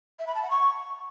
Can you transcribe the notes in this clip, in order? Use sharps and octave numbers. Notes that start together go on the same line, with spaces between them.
E5
B5
A5
F#5
C#6